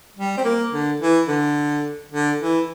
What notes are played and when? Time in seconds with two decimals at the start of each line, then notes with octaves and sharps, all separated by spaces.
0.17 G3
0.37 C4
0.44 A#3
0.73 D3
1.00 E3
1.28 D3
2.12 D3
2.40 E3